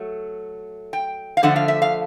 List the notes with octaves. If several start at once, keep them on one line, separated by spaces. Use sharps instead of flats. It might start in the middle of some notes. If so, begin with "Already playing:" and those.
Already playing: F#3 A3
G5
F5
D3 F3 A3 D4 F#5
F5
E5
F5